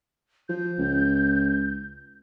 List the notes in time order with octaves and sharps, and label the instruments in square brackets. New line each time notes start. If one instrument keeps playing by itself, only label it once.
[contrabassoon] F3 [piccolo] G6
[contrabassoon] C#2